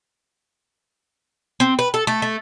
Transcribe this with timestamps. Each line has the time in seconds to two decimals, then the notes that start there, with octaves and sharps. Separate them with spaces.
1.60 C4
1.79 B4
1.94 A4
2.07 A3
2.22 A3